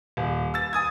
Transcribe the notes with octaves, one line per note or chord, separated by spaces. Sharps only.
D#1
E6 A6
G#5 D#6 G#6